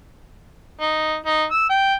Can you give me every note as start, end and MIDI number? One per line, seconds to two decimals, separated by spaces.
0.80 1.16 63
1.26 1.44 63
1.51 1.68 88
1.69 1.94 79